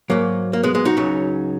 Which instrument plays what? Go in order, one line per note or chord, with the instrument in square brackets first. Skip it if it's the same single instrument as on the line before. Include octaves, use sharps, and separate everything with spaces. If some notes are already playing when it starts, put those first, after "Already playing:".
[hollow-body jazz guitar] G#2 F#3 A#3
A#3
G#3 B3
G#3 B3
D#4 F#4
C#2 C#3 F#3